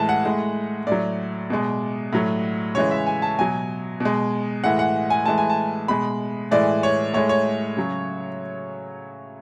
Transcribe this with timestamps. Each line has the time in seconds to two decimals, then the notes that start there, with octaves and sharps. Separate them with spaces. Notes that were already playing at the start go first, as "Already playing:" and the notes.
Already playing: A2 E3 G#3 A5
0.09 F#5
0.25 A2 G#3
0.87 A2 F#3 D5
1.50 B2 G#3
2.13 A2 F#3
2.75 C#3 E3 G#3 C#5
2.91 E5
3.07 G#5
3.22 A5
3.39 B2 F#3 G#5
4.00 B2
4.05 G#3
4.64 A2 E3 G#3 F#5
4.79 F#5
5.10 G#5
5.26 A2 E3 G#3 A5
5.38 G#5
5.50 A5
5.88 B2 G#3 B5
6.51 A2 E3 G#3 D5
6.83 C#5
7.14 A2 G#3 C#5
7.29 C#5
7.77 C#3 F#3